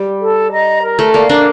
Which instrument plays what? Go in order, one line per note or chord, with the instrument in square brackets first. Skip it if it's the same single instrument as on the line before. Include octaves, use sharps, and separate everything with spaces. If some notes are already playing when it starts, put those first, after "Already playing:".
Already playing: [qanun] G3
[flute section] A4
D#5 A#5
A#4
[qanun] A3
[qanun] A#3 [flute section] D5 F5
[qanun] A#3 D4